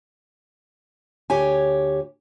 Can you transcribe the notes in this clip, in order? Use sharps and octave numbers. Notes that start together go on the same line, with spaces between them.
D2 G4 C#5 G#5